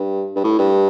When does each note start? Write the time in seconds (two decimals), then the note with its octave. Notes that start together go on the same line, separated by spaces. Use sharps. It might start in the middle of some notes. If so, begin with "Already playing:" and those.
Already playing: G2
0.36 G2
0.44 A2
0.59 G2